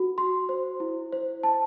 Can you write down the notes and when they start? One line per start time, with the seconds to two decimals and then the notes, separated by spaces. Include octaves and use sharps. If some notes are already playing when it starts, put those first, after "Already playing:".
Already playing: F#4
0.18 C6
0.49 C5
0.80 E4
1.12 C5
1.43 A5